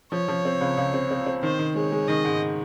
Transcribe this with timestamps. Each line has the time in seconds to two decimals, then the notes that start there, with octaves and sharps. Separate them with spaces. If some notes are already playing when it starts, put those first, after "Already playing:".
0.12 F3 C#5
0.28 F3
0.45 C4
0.61 C#2
0.77 C#2
0.94 C4
1.10 C4
1.26 C4
1.43 D#3 C5
1.59 D#3
1.75 G#3 C#5
1.92 G#3
2.08 D#3 D#5
2.25 G#2